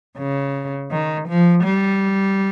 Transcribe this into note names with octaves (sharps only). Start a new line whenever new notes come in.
C#3
D#3
F3
G3